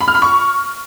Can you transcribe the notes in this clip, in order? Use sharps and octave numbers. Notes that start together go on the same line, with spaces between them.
B5
F6
B5
C#6